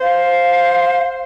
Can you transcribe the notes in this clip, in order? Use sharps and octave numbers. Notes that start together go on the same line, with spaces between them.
C5 F5